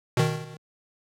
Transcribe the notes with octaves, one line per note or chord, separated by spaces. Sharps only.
B2 D#3